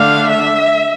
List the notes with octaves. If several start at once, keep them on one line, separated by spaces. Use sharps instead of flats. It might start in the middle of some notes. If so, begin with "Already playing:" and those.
Already playing: D3 A3 D4 F5
E5